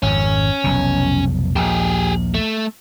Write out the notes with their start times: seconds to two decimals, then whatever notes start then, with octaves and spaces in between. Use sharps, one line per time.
0.03 G#1 F2 C#4
0.64 F1 B1 B2
1.56 A#1 D#2 G4 G#4
2.34 A3